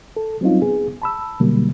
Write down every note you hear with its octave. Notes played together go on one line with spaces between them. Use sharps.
A4
F#3 G3 C4 C#4 D#4 F4
B3 G#4
A5 B5 E6
B2 D3 F#3 G3 A#3